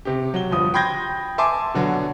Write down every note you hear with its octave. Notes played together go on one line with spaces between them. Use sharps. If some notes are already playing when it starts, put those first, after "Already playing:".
C3 G4
F#3 G7
G1 F3 D#6
G5 B5 C6 G6 G#6 A#6
E5 G#5 A5 C6 D6
B2 D3 F#3